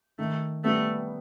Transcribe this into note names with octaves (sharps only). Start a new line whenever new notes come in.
D#3 A3
G3 A3 B3